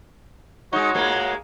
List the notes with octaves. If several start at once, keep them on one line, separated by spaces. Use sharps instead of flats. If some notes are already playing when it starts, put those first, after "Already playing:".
G#3 D#4 F#4 C#5
A2 G#3 A#3